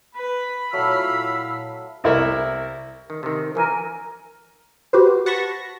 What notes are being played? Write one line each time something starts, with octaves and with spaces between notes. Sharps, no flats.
B4 B5
A#2 F#3 A3 E4 F5 E6
C2 E4 A#4 E5
D#3
C3 D#3
E3 F3 A#4 G#5
F#4 G4 B4 C5
F#5 A5 B5 C#6 A#6